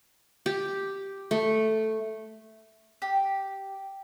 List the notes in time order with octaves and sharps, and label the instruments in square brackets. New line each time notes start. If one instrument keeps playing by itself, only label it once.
[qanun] G4
A3
[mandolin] G4